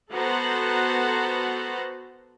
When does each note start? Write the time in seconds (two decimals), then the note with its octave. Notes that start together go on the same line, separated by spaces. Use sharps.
0.11 B3 F#4 A4 C5 F#5 A#5